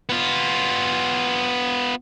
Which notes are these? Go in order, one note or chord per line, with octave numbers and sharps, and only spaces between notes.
B3 F4